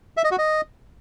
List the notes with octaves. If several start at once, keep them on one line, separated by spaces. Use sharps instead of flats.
E5
D#5
F#4
D#5